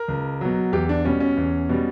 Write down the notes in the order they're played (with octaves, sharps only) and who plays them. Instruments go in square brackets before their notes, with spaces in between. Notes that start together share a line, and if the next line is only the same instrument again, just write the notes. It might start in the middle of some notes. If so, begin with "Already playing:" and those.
Already playing: [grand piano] A#4
C#2
B2 F#3
E2 G4
D4
B2 G3 C#4
C#4
E2
B2 G3